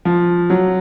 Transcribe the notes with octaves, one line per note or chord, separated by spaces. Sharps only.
F3
F#3